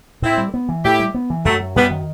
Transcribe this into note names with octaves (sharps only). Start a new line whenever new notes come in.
A2 C4 E4
G3
B3
E3
A2 E4 G4
G3
B3
E3
F#2 F#3 A3
F#3
F#2 G3 B3
D#3